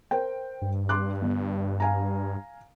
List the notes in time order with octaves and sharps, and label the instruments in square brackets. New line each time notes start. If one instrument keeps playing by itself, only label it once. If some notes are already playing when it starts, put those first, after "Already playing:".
[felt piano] A#4 C5 G5
[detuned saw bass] G2
[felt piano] C6 D6 F#6
G1
F5 G#5 A#5